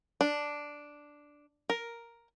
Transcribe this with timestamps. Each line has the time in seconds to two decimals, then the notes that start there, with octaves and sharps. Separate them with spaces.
0.21 D4
1.70 A#4